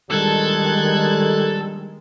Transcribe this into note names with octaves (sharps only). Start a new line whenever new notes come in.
A#1 D#3 G3 G#3 A4 F#6 G#6